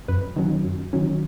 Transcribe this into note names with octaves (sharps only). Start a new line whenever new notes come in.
F#2 B4
D#3 F#3 C#4
F#2
D#3 F#3 C#4